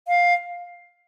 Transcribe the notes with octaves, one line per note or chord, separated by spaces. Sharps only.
F5